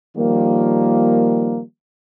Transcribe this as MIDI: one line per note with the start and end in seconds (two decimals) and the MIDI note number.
0.17 1.62 51
0.17 1.62 53
0.17 1.62 55
0.17 1.62 58